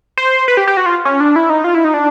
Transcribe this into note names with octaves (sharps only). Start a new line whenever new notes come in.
C5
B4
G4
G4
F#4
F4
C#4
D4
E4
D#4
F4
E4
D#4
D4